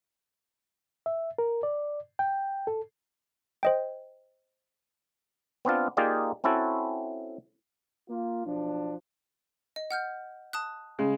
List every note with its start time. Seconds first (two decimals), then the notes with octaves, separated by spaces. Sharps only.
1.06 E5
1.38 A#4
1.63 D5
2.19 G5
2.67 A4
3.63 C5 D#5 G5
5.65 B3 C4 D4 F4
5.97 A#3 D#4 F4 G4 G#4 D5
6.44 C4 C#4 E4 F#4 A4
8.09 A#3 F4
8.44 B1 F3 D4
9.76 D#5
9.91 F#5 F6 G6
10.53 A5 D#6 F#6
10.99 C#3 G#3